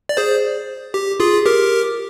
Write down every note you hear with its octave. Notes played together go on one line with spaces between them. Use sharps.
D5
G#4 C5
G4
F4 G#4
G4 A#4